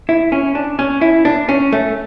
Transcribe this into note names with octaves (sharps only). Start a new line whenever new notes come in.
E4
C#4
D4
C#4
E4
D4
C#4
A3